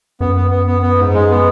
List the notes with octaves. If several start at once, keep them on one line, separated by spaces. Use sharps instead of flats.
F#2 B3
B3
B3
B3
B3
G#2
G#3
B3